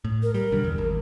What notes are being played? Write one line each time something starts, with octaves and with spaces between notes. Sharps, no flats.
A2
A#4
G3 A#4
B1 D3 G3
E2
G#1